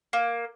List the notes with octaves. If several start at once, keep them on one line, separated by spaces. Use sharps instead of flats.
A#3